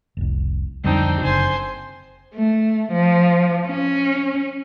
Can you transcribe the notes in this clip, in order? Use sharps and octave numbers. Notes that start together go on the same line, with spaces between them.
F1 C2
F2 D3 G3 C4 D4 D#4
F#1 C#3 C5 G#5 C6
A3
F3
C#4